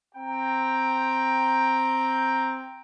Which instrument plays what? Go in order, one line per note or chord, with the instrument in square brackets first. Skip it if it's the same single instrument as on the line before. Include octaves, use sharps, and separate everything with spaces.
[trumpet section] C4 G5 A#5